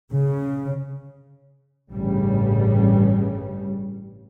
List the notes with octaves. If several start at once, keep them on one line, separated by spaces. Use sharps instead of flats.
C#3
A1 G2 C#3 G3